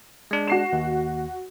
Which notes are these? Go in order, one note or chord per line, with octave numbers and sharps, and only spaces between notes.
G#3 D4
F#4 C7 E7
D#2